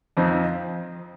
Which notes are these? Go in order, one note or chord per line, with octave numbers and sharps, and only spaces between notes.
F2 F3 C4 D#4